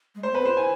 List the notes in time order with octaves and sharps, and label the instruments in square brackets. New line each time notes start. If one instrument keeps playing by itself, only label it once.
[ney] G#3
[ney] A3 [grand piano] C5
[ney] B3
[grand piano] B4
[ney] C4
[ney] F4 [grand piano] C5
[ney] E4 [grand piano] G#5